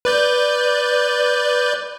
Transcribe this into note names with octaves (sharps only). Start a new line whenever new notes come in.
B4 D5 G6